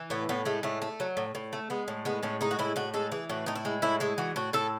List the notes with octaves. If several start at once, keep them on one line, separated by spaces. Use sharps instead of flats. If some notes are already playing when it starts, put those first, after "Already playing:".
Already playing: E3
A2 B3
A2 B3
G#3 A3
A2 A3
A3
F#3
A2
A2
A3
G#3 B3
A2
G#3 B3
A2 C#4
G#3 D#4
F#4
A2 E4
A2 F#4
G#3 A4
E3 G#4
A2 F#4
A2 D#4
E4
G#3
A2 E4
G#3 E4
E3 F#4
A2 F#4
A2 A4